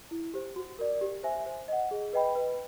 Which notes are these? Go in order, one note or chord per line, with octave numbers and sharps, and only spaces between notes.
E4
G4 C5
F#4
A#4 D5
G4
C5 E5 G#5
C5
D#5 F#5
G#4
B4 D#5 G5 B5
B4